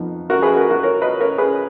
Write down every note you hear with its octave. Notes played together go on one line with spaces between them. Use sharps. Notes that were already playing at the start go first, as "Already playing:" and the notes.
Already playing: F2 F3 B3 D#4
F#4 A#4
G#4 B4
F#4 A#4
F#4 A#4
A#4 C#5
B4 D#5
A#4 C#5
G#4 B4